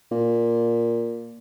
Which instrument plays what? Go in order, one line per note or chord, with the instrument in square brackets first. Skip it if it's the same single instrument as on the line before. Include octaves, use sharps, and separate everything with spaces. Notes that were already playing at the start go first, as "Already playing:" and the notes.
[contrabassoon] A#2